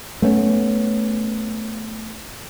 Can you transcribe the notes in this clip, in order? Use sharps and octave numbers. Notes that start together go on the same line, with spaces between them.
A3 B3 C#4